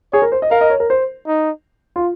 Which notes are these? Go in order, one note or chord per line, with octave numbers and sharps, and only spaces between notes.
G#4 C#5
A#4
C5
D#5
A#4 F5
D#5
C#5
A#4
C5
D#4
F4